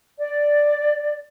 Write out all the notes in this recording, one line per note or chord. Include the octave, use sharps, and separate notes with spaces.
D5